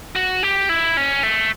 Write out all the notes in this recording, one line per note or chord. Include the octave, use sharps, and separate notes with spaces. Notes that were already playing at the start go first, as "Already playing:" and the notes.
F#4
G4
E4
C#4
A3